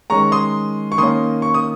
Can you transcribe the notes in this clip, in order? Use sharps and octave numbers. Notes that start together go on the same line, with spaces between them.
D#3 G#3 C#4 A#5 C#6
C6 D#6
C#6
D#3 A#3 C#4 C6 D#6
C#6
D#6